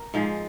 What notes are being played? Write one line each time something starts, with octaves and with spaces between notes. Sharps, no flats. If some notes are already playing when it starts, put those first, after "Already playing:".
Already playing: A#4
G#2 F3 G#3